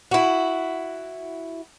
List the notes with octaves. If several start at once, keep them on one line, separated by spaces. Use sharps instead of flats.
E4 F#4